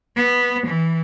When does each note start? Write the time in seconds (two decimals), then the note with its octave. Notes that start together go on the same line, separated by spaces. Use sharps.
0.16 B3
0.67 E3